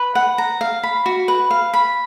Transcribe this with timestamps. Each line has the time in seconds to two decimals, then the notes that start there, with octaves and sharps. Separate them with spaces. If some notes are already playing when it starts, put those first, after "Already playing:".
Already playing: B4
0.15 F#5
0.38 A#5
0.61 F5
0.83 B5
1.06 F#4
1.28 B4
1.51 F5
1.74 B5